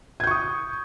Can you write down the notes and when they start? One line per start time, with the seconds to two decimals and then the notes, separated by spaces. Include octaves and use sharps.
0.20 G#6
0.24 G6
0.27 C#6
0.31 D#6